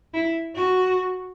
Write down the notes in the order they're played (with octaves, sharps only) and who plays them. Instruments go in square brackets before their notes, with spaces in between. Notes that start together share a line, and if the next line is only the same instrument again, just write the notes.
[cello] E4
F#4